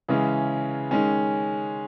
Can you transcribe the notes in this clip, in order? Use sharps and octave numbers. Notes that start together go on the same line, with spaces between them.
C#3 E3 G#3 C#4
D#3 G#3 C#4